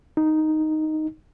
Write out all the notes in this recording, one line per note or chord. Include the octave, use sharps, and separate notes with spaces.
D#4